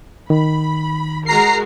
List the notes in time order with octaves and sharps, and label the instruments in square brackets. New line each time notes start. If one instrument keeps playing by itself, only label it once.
[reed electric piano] D#3 [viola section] B5
[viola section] G#3 F#4 A#4 [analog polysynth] A#5 C7